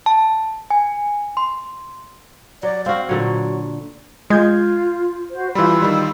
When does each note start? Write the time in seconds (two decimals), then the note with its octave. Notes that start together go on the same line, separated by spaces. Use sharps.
0.06 A5
0.70 G#5
1.37 C6
2.63 F#3 D5
2.86 C4 F#4 F5
3.09 A#2 D3 F#3 C#5
4.30 G#3 F4 G6 G#6
5.30 F#4 C5
5.55 E3 G3 F4 B5 C6 E6
5.82 D#3 G3 B5